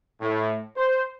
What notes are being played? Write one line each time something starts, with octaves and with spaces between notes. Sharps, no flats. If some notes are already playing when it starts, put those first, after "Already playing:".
A2
C5